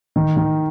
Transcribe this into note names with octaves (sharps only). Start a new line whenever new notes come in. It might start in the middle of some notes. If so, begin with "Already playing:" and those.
D#3
D#3